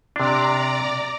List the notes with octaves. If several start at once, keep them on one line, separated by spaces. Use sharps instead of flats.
C3 D4 D5 A#5 D6